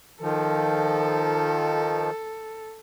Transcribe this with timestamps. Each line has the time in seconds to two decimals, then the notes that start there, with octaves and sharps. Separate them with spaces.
0.21 D#3 F3 A4